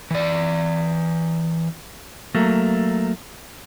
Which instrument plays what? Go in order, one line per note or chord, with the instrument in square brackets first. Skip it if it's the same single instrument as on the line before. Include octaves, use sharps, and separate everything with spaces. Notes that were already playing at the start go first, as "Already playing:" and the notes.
[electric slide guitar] E3 D5
[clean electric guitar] F#3 A3 A#3